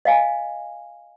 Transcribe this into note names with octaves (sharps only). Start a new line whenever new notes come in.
D#5 F5 G#5